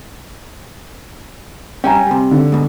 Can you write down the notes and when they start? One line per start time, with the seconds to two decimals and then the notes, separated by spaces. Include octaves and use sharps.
1.84 G2 G3 C#4 G5 G#5 A#5
2.07 C3 G3
2.31 D3
2.52 G#2 B2